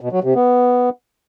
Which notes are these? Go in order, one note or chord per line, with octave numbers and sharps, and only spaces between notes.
B2
F#3
C3
B3